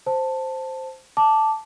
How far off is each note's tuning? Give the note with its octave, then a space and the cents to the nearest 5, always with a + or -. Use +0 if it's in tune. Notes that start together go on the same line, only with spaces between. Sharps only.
C5 +0 A5 +10
A5 +0 D6 +0